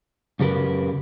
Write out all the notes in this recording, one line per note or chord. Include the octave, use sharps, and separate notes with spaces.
F#2 C#3 G4 A#4 B4